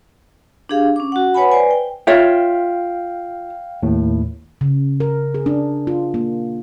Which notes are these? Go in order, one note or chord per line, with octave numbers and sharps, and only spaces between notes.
D4 G4 G#4 F5
C#4 D6
F#4 F#5
B4 C#5 F#5 G#5 B5
B4 C5 D5 G#5
G5
F4 C#5 E5 F5 G5
D#2 A2
C#3
A#4
G#4
D4
F4
A#3